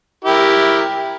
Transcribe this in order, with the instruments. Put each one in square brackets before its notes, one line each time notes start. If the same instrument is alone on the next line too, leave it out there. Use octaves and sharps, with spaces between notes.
[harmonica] E4 G4 A#4